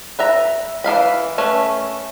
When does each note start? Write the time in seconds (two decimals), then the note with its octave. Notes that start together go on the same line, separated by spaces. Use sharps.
0.19 B4 E5 A#5
0.84 E3 D#4 F5 B5
1.38 A3 C#4 B4